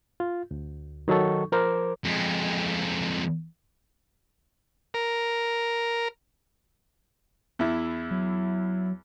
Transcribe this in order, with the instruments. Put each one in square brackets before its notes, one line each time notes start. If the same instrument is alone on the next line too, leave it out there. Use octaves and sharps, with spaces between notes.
[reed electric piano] F4
D2
D#3 F#3 D#4 A4 C#6
F3 A#4 C5 D6
[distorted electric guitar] F2 G#3
[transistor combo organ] A#4
[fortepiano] E2 E4
[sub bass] F#3